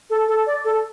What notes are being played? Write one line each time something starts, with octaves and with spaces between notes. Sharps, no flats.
A4
A4
D5
A4